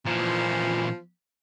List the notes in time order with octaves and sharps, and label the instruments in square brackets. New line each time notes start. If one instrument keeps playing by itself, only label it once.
[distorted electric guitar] A#2 E3 [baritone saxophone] F3